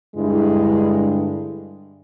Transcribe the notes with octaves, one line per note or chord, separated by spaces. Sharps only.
G2 D3 G#3 E4